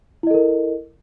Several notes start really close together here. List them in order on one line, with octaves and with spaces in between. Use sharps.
E4 D#5 A4 A#4